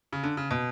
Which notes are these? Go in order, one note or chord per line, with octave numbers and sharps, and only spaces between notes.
C#3
D3
C#3
B2